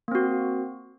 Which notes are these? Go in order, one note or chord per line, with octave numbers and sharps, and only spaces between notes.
A#3 C4 F#4